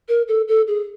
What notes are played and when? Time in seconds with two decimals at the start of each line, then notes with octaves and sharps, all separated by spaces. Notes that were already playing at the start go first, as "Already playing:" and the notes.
0.09 A#4
0.28 A4
0.48 A4
0.67 G#4